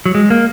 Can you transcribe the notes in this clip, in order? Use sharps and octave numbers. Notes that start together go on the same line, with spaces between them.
F#3
G#3
A#3